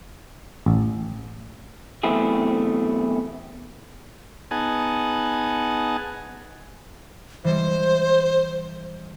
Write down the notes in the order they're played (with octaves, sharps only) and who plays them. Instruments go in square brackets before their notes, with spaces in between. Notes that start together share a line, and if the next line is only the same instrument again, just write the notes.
[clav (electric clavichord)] A1
[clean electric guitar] B1 E2 A3 C4 E4 G#4
[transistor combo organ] B3 D#4 G#4 F#5 G#5 A5
[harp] E3 G3 G#3 [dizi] C5